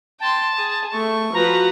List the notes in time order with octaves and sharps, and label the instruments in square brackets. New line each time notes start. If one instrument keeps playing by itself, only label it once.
[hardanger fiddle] G5 C6 [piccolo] A5
[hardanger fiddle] G#4
[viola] A3 [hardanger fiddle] C#6
[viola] F3 [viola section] F#4 B4 [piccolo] A#5